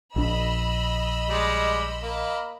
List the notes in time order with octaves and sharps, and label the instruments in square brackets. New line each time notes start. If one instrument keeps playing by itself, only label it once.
[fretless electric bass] A#1 D4 [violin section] D#5 B5 E6
[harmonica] G3 G#3
A#3